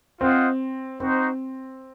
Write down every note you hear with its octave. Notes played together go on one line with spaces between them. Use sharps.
C4 F4 C5 D#5 F#5
C4 D#4 F#4 C5